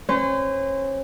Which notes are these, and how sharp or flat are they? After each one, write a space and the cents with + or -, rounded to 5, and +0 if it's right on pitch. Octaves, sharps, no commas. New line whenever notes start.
C#4 -35 C5 -40